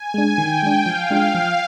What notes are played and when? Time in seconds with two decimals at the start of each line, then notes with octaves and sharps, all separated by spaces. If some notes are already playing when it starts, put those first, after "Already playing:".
Already playing: G#5
0.14 G#3 D4
0.38 D#3 G5
0.63 G#3 D4
0.86 F3 F5
1.10 G#3 D4 F4
1.34 F3 F5